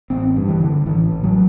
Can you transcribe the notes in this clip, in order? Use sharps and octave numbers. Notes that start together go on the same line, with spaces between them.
A1 C4
G2
E3
D3
A1 E3
A1
F#3